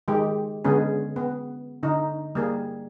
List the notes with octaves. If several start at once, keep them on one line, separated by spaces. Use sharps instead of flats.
D#3 G#3 G4
D3 G#3 B3 C#4 G#4
B3
D3 D#4
G3 A#3 G#4